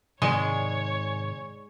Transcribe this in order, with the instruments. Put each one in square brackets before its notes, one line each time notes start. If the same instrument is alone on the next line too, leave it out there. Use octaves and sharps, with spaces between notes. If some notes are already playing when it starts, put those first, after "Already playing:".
[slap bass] G#2 D#3 [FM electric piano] C3 D5 G#5 [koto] G#3 [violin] C#5